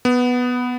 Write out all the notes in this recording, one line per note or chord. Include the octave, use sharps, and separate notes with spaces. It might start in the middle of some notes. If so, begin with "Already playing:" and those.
B3